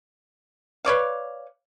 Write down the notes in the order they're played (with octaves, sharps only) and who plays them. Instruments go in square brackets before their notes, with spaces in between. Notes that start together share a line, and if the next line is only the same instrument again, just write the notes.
[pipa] B4 C#5 D5 F5